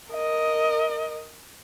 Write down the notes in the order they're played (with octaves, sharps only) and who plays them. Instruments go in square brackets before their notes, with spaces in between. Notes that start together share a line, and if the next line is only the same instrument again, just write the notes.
[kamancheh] A#4 D#5